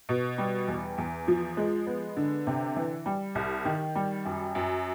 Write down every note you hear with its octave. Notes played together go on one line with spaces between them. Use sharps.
B2
G3
E2
E2
F3
G#3
B3
D3
C3
E3
G3
C2
D#3
G3
F#2
F#2